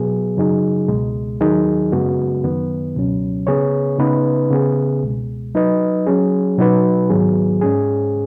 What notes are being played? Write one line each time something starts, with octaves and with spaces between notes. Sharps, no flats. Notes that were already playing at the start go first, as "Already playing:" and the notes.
Already playing: B2 F#3 B3 G#4
F#2 C#3 F#3 D#4 G#4
C#2 B2 G#3
D#2 D#3 F#3 D#4 G#4
F#2 C#3 G#3 B3 F#4
F#2 D#3 B3
C#2 B2 F#3 C#4
C#3 B3 G#4 C#5
C#3 B3 D#4 B4
C#3 B3 G#4
C#2 B2 G#3
F#3 D#4 B4 D#5
F#3 C#4 G#4
B2 F#3 D#4 F#4 B4
G#2 D#3 F#3 B3 G#4
G#2 G#3 C#4 G#4